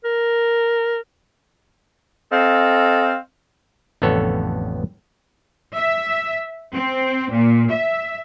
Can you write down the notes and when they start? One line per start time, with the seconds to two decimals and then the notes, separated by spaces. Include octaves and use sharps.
0.05 A#4
2.31 C4 A4 D#5 F5
4.02 A1 F2 D3 B3 A4 C#5
5.75 E5
6.73 C4
7.32 A#2
7.70 E5